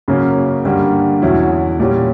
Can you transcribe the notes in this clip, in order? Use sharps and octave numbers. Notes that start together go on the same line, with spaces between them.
F#2 C#3 F#3 A#3 C#4
G2 D3 G3 A#3
E2 B2 F#3 C#4 E4
A#2 G3 C#4